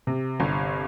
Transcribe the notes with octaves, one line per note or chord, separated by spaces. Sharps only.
C3
G1